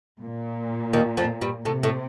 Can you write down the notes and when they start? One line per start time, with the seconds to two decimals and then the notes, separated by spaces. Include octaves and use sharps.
0.21 A#2
0.93 D#2 D#3
1.17 F2 F3
1.41 G2 G3
1.65 A2 C3 A3
1.83 A2 A3